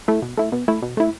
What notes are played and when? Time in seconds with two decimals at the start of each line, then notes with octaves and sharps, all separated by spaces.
0.08 A3 E4
0.22 B2
0.37 A3 E4
0.52 B2
0.68 A3 E4
0.82 B2
0.97 A3 E4